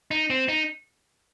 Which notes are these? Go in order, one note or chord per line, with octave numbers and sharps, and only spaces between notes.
D#4
C4
D#4